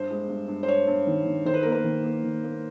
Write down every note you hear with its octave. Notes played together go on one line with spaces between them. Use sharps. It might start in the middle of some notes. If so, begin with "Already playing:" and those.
Already playing: G2 C5
G#3
G2
G2
C5
G2 C#5
G2
D#3
D#3
D#3 C5
B4
A#3 A#4
B4
D#3
A#3
D#3
A#3